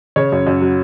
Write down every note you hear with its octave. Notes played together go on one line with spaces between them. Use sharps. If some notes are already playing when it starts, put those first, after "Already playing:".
C#3 C#5
F#2
F#2
F#3